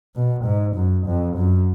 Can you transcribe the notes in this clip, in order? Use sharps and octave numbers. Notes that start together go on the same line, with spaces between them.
B2
G#2
F#2
F2
F#2